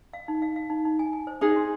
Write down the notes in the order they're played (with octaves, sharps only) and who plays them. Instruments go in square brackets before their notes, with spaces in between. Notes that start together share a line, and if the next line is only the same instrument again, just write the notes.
[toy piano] F5
D#4
F5
F5
D#4
D#4
G#5
G#5
C5
[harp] D#4 G#4 [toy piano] C5
[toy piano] C6